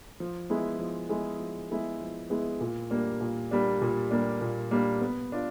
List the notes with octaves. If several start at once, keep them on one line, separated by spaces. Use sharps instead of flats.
F3
G#3 B3 E4 G#4
F3
G#3 B3 E4 G#4
F3
G#3 B3 E4 G#4
F3
G#3 B3 E4 G#4
A#2
G3 A#3 D4
A#2
G3 A#3 D4
A#2
G3 A#3 D4
A#2
G3 A#3 D4
B3
D4 F4